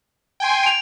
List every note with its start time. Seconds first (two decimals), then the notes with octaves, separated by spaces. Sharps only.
0.40 G5 G#5 C6
0.63 D7 F7